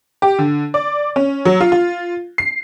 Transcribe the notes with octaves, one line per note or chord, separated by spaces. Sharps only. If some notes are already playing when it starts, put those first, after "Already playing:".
G4
D3
D5
C#4
F#3
F4
F4
C7